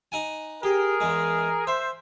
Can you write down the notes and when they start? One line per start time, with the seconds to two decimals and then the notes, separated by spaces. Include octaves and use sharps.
0.12 D#4 F#5 G#5
0.63 G4 G#4 A#4
1.01 E2 G#3
1.67 C5 E5